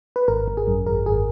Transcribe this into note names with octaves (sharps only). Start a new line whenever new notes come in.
B4
G#1 A#4
G#1
G#4
F#2
G#1 A#4
G#1 G#4